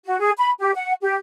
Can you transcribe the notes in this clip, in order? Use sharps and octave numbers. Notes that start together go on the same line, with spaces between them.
F#4
G#4
B5
G4
F#5
G4